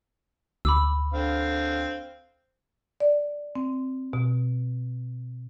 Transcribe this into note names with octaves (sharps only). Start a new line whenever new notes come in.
D2 B5 D6 E6
D3 C4 F5
D5
C4
B2